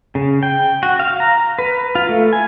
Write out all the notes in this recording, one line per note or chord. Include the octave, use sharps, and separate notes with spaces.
C#3
G5
F#4
F5
A#5
B4
F4
A3
G#5